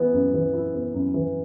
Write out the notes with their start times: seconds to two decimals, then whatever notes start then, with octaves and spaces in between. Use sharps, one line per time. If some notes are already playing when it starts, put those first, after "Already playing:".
Already playing: E3 B3 E4
0.13 F#2
0.34 E3
0.54 E4
0.74 B3
0.94 F#2
1.14 E3